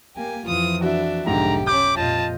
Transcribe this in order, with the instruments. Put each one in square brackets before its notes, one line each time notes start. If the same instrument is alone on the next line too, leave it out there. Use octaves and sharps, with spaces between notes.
[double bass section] A#3 [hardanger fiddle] G4 G#5
[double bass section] F2 E3 F3 [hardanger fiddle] F4 D#6
[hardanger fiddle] D4 E5 [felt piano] F#4
[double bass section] F1 B1 [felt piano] G#2 D3 [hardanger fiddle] G4 [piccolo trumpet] A#5
[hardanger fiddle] C#4 B5 [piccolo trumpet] D6 [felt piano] G6
[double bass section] F2 A#2 [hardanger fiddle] F4 D#5 [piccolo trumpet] A5